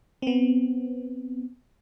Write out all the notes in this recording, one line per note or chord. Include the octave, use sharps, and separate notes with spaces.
B3 C4